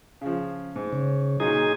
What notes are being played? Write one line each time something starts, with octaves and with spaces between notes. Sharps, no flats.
C#3 F3
G#2
C#3
A#2 F#3 D#4 G#4